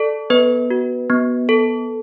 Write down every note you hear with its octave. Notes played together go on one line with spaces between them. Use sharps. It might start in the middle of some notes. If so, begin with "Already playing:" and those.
Already playing: A4 D5
B3 B4
F#4
B3
A4